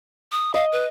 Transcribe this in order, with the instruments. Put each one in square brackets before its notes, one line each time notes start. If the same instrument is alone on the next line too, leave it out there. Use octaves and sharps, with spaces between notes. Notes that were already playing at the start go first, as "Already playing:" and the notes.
[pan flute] D#6
[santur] D#5 [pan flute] F5
[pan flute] B4